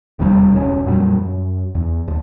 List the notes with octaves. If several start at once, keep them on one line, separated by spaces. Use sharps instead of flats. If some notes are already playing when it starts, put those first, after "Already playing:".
E1 D#2 C3 G3
E1 C#2 C#4
F2 A#2 F#3 G3
F#2
E2
D#2